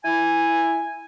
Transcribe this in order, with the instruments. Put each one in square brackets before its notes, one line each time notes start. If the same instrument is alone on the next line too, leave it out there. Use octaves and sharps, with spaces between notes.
[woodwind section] E4 G#5